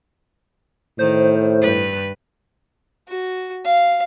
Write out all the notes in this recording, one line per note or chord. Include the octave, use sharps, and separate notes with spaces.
A2 D#3 C5
G2 B4
F#4
F5